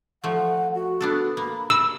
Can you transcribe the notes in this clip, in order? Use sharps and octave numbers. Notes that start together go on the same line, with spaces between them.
F3 A3 F#5
F#4
B3 D4 A4
A#3 B5
E6